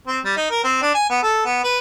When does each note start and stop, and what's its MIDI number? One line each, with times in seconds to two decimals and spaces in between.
0.07 0.19 60
0.25 0.33 55
0.37 0.48 63
0.50 0.60 70
0.64 0.78 60
0.82 0.92 62
0.94 1.05 80
1.09 1.18 59
1.23 1.45 69
1.45 1.64 59
1.64 1.79 71